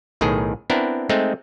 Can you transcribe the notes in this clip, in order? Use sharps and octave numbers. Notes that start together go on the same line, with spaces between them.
B1 A2 D#3 G#4
B3 C4 D4 E4 A#4
G#3 A3 C4 D#4